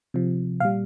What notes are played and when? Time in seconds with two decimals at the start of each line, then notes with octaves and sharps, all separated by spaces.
0.14 C3 F3
0.60 A#2 G3 F5